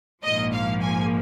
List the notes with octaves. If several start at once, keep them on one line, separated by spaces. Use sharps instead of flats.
A#1 G#2 F3 A#3 D#5
F5
G#5